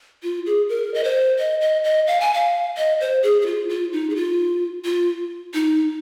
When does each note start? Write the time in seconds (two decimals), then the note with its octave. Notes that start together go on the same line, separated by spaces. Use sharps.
0.23 F4
0.46 G#4
0.69 A#4
0.94 D#5
1.04 C5
1.39 D#5
1.61 D#5
1.84 D#5
2.07 F5
2.21 G#5
2.34 F5
2.77 D#5
3.00 C5
3.23 G#4
3.42 G#4
3.46 F4
3.69 F4
3.93 D#4
4.10 G#4
4.16 F4
4.85 F4
5.54 D#4